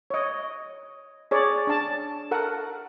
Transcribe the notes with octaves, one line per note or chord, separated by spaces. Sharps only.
C#5 D#5
G#4 C#5 D5
D4 A5
A4 A#4 F#5